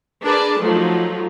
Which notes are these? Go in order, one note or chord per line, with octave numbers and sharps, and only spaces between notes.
D4 G#4 A#4 B4 D5 A5
F3 F#3 A3 D#4 A4